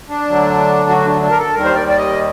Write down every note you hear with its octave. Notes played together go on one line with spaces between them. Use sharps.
D4
D2 D3 F#3
F#4
D4
D4
A#4
A4
D#2 D#3 G3 A#4
C5
D5
D5
D#5